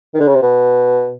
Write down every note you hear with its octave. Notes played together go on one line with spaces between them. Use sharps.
D#3
D3
C#3
C3
B2